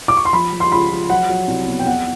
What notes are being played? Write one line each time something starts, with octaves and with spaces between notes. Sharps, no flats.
D6
C#6
C6
F3 B5
F3
C6
C#2 B5
F3
F#3 F#5
F#3
C2
B2
G5
E2 F#5